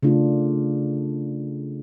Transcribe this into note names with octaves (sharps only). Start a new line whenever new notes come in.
C#3 A3 D4 F4